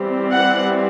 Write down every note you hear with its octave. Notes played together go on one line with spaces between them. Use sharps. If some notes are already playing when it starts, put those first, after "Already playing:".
Already playing: E3 G3 C4
F#5